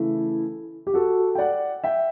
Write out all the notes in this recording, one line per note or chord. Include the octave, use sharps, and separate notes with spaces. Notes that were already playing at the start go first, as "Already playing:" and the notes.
Already playing: C#3 E3 A3 E4
G4
F#4 A4
G5
D5 F#5
E5 G5